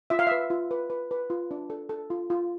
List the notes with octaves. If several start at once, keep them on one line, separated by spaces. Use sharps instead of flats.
F4 E5
F5
B4 E5
F4
B4
B4
B4
F4
D4
A4
A4
F4
F4